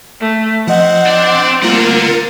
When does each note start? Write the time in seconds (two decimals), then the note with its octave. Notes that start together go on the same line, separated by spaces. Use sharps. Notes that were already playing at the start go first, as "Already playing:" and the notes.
0.20 A3
0.67 F3 C4 D#5 F#5
1.06 D4 D5
1.62 D3 G3 A3 A#3 F4 A#4 F#5